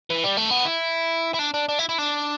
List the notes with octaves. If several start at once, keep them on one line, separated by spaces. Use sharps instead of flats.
E3
G3
A3
B3
E4
E4
D4
D4
D4
E4
E4
D4